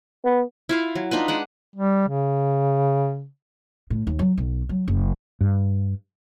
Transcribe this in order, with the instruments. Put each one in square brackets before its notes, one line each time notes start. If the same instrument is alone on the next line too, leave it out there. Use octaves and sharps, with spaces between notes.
[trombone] B3
[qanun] E4 F4 F5
F#3
D4 D#4 F4 B4
G#3 D4 F#5
[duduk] G3
C#3
[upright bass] A2
D#2
F#3
B1
F#3
F#1
[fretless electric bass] G2